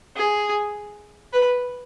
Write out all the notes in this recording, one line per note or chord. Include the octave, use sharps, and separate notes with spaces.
G#4
B4